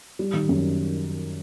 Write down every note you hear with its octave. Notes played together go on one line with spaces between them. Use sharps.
G3
D#3
F#2